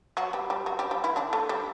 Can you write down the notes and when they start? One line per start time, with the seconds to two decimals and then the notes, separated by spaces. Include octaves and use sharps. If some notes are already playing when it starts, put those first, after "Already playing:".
0.17 F#3 F#4
0.33 G3 G4
0.50 G3 G4
0.66 F#3 F#4
0.79 G3 G4
0.91 G3 G4
1.04 E3 E4
1.16 D3 D4
1.33 A3 A4
1.49 G3 G4